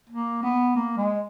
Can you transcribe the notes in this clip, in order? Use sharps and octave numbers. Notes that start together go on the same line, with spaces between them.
A#3
B3
A#3
G#3